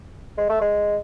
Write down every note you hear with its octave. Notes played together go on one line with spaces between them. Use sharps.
G#3
A3
G#3